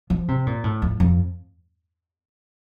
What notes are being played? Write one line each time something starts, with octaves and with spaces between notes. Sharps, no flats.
F3
C3
A#2
A2
F2
F2